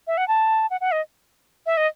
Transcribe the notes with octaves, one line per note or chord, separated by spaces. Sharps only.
E5
F#5
A5
F#5
F#5
D#5
E5
D#5